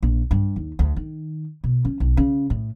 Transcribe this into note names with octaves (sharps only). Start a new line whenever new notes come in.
A#1
G2
D#2
D2
D#3
B2
C#4
B1
C#3
A2